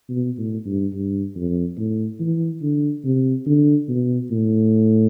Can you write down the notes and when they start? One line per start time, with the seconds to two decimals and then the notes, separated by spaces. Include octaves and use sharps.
0.10 B2
0.38 A2
0.66 G2
0.94 G2
1.36 F2
1.78 A2
2.20 E3
2.62 D3
3.05 C3
3.46 D3
3.89 B2
4.31 A2